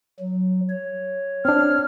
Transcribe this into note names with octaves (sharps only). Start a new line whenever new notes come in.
F#3
C#5
C4 D4 F6